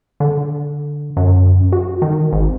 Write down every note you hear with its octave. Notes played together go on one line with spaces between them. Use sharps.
D3
F#2
F#4
D#3
G#1